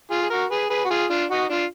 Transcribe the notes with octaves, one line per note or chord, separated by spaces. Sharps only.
F4 G#4
G#4
F#4 A#4
G#4 B4
G#4 B4
F#4
F4 G#4
D4 F4
D#4 F#4
D4 F4